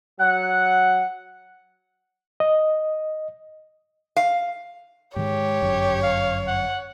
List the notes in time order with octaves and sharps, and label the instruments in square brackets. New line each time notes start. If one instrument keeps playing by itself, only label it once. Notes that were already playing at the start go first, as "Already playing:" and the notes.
[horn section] F#3 F#5
[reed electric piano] D#5
[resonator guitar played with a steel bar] F5
[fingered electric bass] G#2 D#3 G#3 [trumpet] G4 [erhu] C#5
[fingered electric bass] G1 F#2
[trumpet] F5
F#5